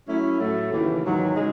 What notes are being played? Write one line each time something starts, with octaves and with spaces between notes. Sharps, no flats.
F#3 A3 C#4 E4
A2 F#3 A3
D#2 C#3 E3
G#2 D#3 F#3
C#3 G#3 D#4